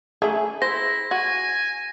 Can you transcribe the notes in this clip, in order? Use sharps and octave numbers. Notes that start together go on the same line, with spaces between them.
A3 E4 G#4
E4 C5 A#6
F#4 G#5